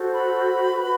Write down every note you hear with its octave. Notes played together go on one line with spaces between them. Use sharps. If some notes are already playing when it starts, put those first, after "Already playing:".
Already playing: F#4 A4 C5
B5
F#4 B4